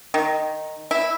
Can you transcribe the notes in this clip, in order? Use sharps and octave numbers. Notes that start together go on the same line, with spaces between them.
D#3
E4